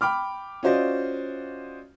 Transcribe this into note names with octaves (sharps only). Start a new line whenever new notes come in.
G5 B5 D6 F6
C#4 F4 F#4 C5 D5 D#5